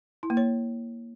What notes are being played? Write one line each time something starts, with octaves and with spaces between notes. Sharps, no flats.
E4
A#3
C#5